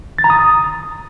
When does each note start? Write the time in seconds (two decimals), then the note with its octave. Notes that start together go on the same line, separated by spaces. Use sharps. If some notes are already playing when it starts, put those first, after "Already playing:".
0.18 A6
0.24 A#5
0.30 D#6